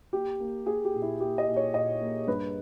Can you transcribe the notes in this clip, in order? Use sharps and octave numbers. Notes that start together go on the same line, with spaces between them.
A#3 G4
A#3
A#3 G#4
G4
A#2
E4
A#3 G4
D#5
A#2
C#5
A#2 D#5
A#3
G2 B4